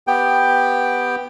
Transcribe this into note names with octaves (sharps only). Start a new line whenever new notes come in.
B3 G4 G5